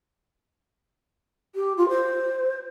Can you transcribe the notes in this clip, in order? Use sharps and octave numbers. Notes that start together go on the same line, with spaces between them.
G4
F4
C5